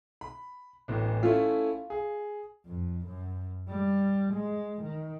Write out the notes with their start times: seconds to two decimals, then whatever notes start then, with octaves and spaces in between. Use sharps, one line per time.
0.21 B5
0.88 D1 A1 B3
1.23 A3 C#4 E4 F4
1.90 G#4
2.66 F2
3.06 F#2
3.69 G3
4.34 G#3
4.82 D#3